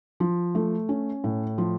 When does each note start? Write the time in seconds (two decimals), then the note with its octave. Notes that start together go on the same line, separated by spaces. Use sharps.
0.20 F3
0.55 A3
0.89 C#4
1.24 A2
1.58 F3